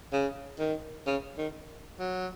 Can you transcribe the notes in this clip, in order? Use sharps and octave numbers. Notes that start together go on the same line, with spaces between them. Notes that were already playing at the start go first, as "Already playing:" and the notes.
C#3
D#3
C#3
D#3
F#3